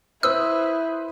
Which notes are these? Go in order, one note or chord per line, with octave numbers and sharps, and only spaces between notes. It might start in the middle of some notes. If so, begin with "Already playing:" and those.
E4 B4 C5 D#6 E6